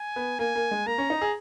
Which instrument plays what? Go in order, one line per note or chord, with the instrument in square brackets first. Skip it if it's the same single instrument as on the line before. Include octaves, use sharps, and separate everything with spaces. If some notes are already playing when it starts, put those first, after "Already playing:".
Already playing: [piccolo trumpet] G#5
[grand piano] B3
[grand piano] A#3 [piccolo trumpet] G#5
[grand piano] A#3
G#3
[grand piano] A#3 [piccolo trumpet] A#5
[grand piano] C#4
D#4
G#4